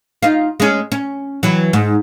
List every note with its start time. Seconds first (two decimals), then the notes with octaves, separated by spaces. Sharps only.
0.23 D#4 F4
0.60 G#3 C#4
0.92 C#4
1.43 E3 F#3
1.73 G#2